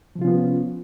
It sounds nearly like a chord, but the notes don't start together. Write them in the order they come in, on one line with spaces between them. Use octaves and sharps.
F3 C3 F4 C#4 B3